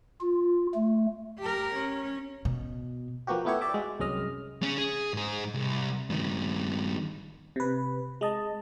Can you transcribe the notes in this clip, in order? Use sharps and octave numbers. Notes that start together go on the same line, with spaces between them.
F4
A3
G4 A#4
C#4
B2
F3 A#3 B3 F#4 G4
A3 B3 E4 G4 C#5
G4 D5 E5 D6
G#3 F#4
C2 F#2 G#3 C#4 D#5 F6
C#4 G#4
G#4
G#2 G#4
C2
G2 D#3
C3 B4
G#3 D#5 A5